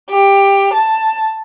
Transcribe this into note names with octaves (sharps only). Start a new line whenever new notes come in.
G4
A5